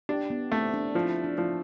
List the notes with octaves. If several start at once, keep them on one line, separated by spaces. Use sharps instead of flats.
D4 G4
B3
A3 C4
D4
F3 E4
D4
F3